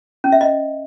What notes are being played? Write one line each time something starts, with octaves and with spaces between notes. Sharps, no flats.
C#4
E5
D#5